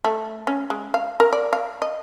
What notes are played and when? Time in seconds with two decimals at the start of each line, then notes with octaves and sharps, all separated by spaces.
0.04 A3
0.47 C#4
0.70 G#3
0.94 F5
1.20 A#4
1.33 D5
1.53 F5
1.82 D#5